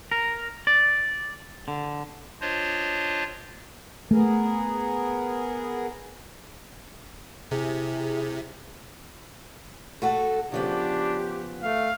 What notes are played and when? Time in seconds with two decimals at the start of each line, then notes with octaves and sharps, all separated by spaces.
0.12 A#4
0.67 D5
1.68 D3
2.41 D4 F4 C5 C#5 D#5
4.11 A3 B3 G#4 A#4
7.51 C3 E4 G#4
10.02 A3 F#4 A4
10.52 C#3 F3 B3 D4 G4
11.63 A3 F5